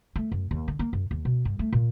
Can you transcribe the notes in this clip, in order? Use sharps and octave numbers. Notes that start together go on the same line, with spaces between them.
A3
F#2
D#2
D3
A#3
F#2
D#2
B2
G2
A3
A#2